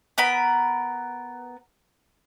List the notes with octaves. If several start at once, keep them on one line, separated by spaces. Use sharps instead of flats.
B3 A#4 B5